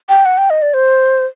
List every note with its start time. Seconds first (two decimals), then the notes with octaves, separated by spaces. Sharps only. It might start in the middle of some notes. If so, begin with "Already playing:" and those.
0.09 G5
0.25 F#5
0.38 G5
0.50 D#5
0.62 D5
0.74 C5